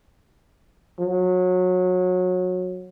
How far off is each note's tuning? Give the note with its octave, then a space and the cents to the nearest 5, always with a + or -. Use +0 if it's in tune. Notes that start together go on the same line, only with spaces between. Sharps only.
F#3 -25